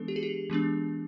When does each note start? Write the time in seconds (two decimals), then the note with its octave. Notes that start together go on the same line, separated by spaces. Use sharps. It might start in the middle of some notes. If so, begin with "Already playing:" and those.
Already playing: E3 G#3 B3 D4 A4
0.08 G4
0.16 G#4
0.23 G4
0.50 E3 G#3 B3 D4